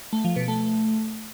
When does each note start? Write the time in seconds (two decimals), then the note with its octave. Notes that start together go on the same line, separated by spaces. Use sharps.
0.13 A3
0.24 F3
0.36 B2
0.48 A3